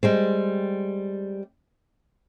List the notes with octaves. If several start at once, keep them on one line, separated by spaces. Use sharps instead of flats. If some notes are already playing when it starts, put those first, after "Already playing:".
G3 G#3 C4